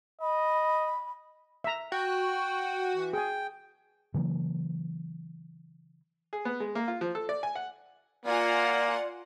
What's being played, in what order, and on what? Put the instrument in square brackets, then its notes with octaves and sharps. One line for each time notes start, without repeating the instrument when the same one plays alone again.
[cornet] D#5 [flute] B5
[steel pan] E5 A#5
[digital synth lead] F#4 [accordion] G5
[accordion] E3
[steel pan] G#4 G#5 [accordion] G5
[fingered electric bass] C#3 E3 F#3 A#3
[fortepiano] G#4
B3
G#3
A#3
F4
F3
A4
D5
G#5
F#5
[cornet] A#3 [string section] F4 F#5 G#5 [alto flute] D5